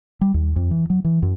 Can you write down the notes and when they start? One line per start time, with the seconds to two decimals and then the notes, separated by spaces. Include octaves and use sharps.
0.21 G3
0.34 D#2
0.56 F2
0.71 E3
0.90 F#3
1.04 E3
1.22 F#2